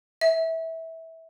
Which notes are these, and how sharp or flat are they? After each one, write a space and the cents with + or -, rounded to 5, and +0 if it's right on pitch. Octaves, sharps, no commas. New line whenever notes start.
E5 -20